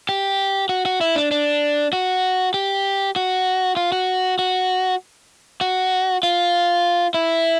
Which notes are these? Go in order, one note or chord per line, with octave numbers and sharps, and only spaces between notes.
G4
F#4
F#4
E4
D4
D4
F#4
G4
F#4
F4
F#4
F#4
F#4
F4
E4